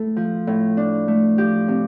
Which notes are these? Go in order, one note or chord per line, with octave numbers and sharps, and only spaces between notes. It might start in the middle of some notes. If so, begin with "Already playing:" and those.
Already playing: A2 A3 A4
F3
A2
D4
A3
F3 G4
C3